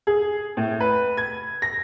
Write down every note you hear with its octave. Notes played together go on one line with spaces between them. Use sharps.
G#4
A2
B4
G#6
A#6